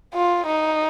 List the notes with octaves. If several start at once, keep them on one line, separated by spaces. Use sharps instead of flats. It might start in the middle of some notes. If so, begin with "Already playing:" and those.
F4
D#4